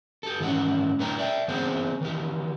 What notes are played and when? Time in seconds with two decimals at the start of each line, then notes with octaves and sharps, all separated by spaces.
0.23 G4 A4
0.40 G#2 D#3 E3 C#4 F#5
0.99 A2 D4 B4 C#5 G5 A#5
1.18 D5 E5 G5
1.48 E3 B3 C4 G#4 C5 F#5
2.01 D#3 E3 G4